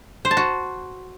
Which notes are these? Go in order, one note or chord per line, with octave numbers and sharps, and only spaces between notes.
C5
A5
F#4